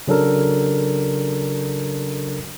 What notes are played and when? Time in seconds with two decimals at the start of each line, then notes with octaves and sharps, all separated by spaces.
0.08 C#3 F#3 D4 A4 A#4